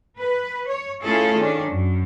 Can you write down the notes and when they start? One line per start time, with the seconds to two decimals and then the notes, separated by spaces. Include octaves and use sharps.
0.19 B4
0.67 C#5
1.02 A3 C#4 E4 F4 G#4 A4
1.36 D#3 C#4 D4
1.71 F#2